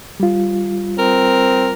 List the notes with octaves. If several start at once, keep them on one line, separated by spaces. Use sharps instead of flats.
G3 F4
C4 A#4